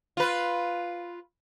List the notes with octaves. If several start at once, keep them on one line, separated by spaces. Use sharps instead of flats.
F4 B4